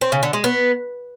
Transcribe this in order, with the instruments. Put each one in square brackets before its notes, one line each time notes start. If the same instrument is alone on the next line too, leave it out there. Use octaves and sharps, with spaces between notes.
[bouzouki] C4
C#3
D3
G#3
B3